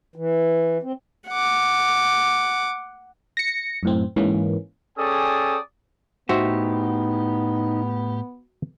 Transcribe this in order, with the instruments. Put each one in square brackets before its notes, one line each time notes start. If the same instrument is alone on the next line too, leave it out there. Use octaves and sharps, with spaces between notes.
[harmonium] E3
C4
[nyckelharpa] F#5 D6
[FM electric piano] A#6 C#7
F#2 A2 C4
G#2 E3 A#3 C#4
[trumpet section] C#4 G#4 A4 D5 G5 D#6
[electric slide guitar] A2 G4 [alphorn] B3 [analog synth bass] D#4 [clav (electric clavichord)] F#4 C5 E5